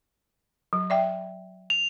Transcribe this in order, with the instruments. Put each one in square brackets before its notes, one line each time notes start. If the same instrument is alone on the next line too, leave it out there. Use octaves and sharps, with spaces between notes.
[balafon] F#3
D5 E5 G5
[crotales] F7